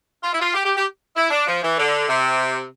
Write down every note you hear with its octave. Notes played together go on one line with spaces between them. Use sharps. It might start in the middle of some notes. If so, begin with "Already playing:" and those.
F4
E4
F4
G4
G4
G4
E4
D4
F3
E3
D3
C3